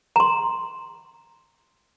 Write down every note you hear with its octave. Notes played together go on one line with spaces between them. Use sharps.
A#5 C6